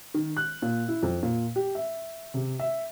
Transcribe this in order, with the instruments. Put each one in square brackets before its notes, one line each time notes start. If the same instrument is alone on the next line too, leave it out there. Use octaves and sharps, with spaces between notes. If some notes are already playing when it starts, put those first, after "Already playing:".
[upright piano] D#3
F#6
A#2
E4
F2
A#2
G4
E5
C3
E5